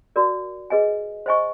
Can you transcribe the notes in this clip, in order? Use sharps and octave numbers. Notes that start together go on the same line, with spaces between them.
F#4 A#4 D5
G#4 B4 D#5 G#5
C5 D#5 G#5 C#6